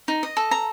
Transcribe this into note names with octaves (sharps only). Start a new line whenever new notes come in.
D#4
D#5
A4
A#5